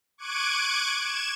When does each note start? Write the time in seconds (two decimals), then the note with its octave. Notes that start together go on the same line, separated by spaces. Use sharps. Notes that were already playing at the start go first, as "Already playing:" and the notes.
0.18 C#6 D6 F#6 G#6 D7 D#7
0.99 G#6 E7